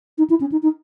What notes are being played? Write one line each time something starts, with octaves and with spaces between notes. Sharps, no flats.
D#4
E4
C#4
D#4
D#4